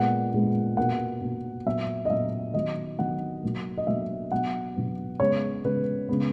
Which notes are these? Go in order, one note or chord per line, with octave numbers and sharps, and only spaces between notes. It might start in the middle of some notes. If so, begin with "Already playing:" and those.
Already playing: A#2 G#3 B3 F#5
A#2 G#3 B3
B2 A#3 F#5
B2 A#3
A#2 F#3 B3 E5
D#5
A#2 F#3 B3 E5
D#3 F#3 B3 D#5
D#3 F#3 B3 F#5
B2 F#3 A#3
D#5
B2 F#3 A#3 E5
B2 F#3 B3 F#5
B2 F#3 B3
C#3 G#3 B3 C#5
C#3 G#3 B3 B4
C#3 G#3 B3